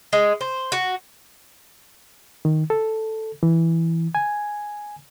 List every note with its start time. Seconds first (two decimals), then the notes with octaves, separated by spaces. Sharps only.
0.13 G#3
0.41 C5
0.72 F#4
2.45 D#3
2.70 A4
3.43 E3
4.15 G#5